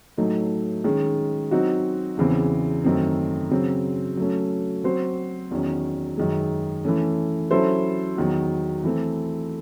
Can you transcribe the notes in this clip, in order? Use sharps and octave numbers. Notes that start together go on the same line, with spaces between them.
A2 F#3 A3 D#4
D#3 G#3 C#4
F#3 C4 D#4 F#4
E2 C#3 E3 C4
F#2 D#3 A3 C4
C#3 F#3 C4
F#3 A3 C#4
F#3 C4 F#4 C5
E2 D#3 F#3 C#4
F#2 D#3 G#3
E3 A3 C#4
F#3 C#4 E4 A4 C5
E2 D#3 F#3
E3 A3 C4